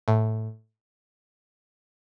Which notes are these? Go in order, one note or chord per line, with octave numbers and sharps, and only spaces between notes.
A2